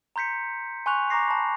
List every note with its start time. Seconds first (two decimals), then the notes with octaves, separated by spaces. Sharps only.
0.16 A#5 C6 G6 B6 C#7
0.86 G#5 C6 C#6 F#6 F7
1.10 A#5 C#6 D6 A#6 C7
1.28 A5 B5